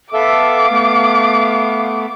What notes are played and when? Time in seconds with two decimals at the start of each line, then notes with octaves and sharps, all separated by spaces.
0.13 B3 A4 E5 F5 D6
0.71 A3 B3